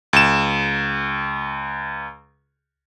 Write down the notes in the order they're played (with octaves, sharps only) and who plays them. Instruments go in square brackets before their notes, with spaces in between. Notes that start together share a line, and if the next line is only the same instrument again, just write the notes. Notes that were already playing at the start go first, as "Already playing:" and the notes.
[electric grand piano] C#2 E7